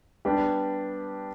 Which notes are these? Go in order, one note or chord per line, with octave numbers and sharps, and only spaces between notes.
G3 B3 D4 G4